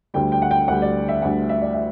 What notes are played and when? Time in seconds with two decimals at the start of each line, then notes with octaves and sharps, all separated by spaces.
0.14 D2 D3 G3 G5
0.32 G5
0.42 F#5
0.51 G5
0.68 D2 D3 G3 F#5
0.82 D5
1.08 E5
1.22 D2 D3 G3 F#5
1.49 E5
1.62 D5
1.74 E5